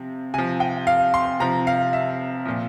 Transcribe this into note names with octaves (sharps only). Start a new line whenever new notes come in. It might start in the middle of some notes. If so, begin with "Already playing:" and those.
Already playing: C3 F3
C3 F3 G#5
G5
F5
C6
C3 F3 A#5
F5
E5
A#2 F3